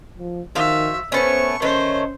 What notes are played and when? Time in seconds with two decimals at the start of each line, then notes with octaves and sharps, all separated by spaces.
0.18 F3
0.55 D#3 F3 F#4 E5 F5
1.12 A3 B3 C#4 C5 C#6
1.62 D#3 A3 C#4 C5 C#5